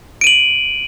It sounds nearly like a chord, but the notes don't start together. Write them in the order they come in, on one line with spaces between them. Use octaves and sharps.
D7 D#7 F#7